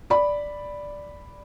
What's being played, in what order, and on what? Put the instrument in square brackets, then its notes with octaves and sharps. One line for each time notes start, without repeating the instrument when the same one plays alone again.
[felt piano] D5 B5